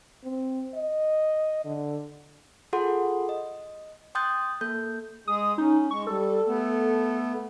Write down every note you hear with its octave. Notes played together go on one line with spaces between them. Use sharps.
C4
D#5
D3
F4 G#4 A4 F#5 C6
D#5
G5 C6 D#6 F#6 G6 A6
A#3 A4 G6
G#3 G#4 D#6
C#4 D#4
G#3 C#6
G3 A4
A3 B3